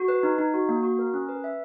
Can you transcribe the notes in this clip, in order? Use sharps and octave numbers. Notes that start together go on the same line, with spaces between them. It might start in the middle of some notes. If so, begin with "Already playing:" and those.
Already playing: F#4
B4
D#4
D#4
F#4
A#3
F#4
A#4
C#4
B4
E5